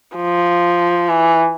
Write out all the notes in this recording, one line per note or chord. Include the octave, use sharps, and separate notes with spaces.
F3
E3